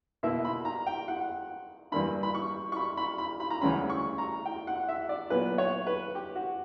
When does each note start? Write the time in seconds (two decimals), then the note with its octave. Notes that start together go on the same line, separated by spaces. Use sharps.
0.23 B2 A#3 E4 E5
0.45 B5
0.65 A#5
0.86 G5
1.08 F#5
1.92 G2 E3 A#3 D4 B5
2.23 B5
2.35 C#6
2.72 C#6
2.76 B5
2.97 B5
3.18 B5
3.40 B5
3.50 A#5
3.61 D2 C#3 E3 G3 C#4 B5
3.90 C#6
4.18 A#5
4.45 G5
4.67 F#5
4.88 E5
5.09 D5
5.30 A#2 F#3 B3 B4
5.58 C#5
5.87 B4
6.15 G4
6.35 F#4